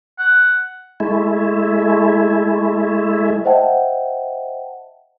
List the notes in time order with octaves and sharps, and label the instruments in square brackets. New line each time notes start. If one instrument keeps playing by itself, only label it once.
[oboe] F#5
[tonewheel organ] G#3 A3 E4
[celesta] C5 D#5 E5 F#5 G5 A5